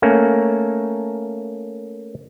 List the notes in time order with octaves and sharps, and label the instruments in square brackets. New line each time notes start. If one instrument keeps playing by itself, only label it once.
[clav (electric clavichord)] A3 A#3 C#4